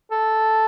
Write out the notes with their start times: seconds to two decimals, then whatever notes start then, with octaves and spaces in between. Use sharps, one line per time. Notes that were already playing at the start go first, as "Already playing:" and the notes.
0.11 A4